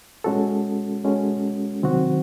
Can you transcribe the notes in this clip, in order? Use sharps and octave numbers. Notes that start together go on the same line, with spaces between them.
G#3 C#4 F#4 A4
G#3 C#4 F#4 A4
C3 D#3 F#3 C4 F#4